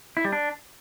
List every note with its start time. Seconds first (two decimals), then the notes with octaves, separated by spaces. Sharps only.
0.17 E4
0.25 G3
0.32 D4